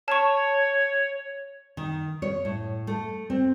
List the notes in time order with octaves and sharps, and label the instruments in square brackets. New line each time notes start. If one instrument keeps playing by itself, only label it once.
[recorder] C#5 [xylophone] A5 C#6
[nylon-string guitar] D#3
C#5
A2
A3
C4